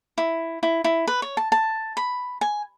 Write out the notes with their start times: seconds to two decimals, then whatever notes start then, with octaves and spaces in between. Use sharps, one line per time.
0.18 E4
0.63 E4
0.84 E4
1.07 B4
1.22 C#5
1.37 A5
1.52 A5
1.97 B5
2.41 G#5